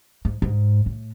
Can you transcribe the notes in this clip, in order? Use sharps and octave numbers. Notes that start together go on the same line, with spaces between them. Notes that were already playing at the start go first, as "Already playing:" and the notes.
G#2
G#2
A2